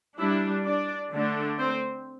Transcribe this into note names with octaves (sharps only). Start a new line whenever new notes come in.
G3 D4 E4
D4 D5
D3 A3 D4
C4 C5